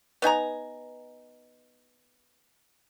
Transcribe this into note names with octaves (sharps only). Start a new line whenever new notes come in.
B3 D#4 G#5 A#5